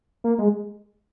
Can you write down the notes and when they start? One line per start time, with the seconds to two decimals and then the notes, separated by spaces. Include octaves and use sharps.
0.24 A#3
0.39 G#3